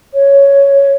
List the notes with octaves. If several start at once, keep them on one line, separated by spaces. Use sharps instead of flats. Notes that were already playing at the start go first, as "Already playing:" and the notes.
C#5